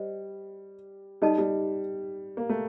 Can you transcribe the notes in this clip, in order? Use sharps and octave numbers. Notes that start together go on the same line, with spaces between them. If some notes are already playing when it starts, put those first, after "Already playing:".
Already playing: G3 C5 D#5
G3 D#4 A4 D#5 A5
G3
A#3
A3